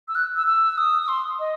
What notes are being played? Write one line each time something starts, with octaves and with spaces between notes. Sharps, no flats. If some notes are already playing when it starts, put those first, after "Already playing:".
E6
F#6
E6
E6
D#6
D#6
C6
D#5